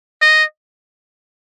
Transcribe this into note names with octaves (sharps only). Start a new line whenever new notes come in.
D#5